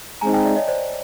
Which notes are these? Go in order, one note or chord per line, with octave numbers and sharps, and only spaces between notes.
G#3 C4 D#4 G#5 A#5
G5 A5
D5 E5
C#5 D#5
C5 D5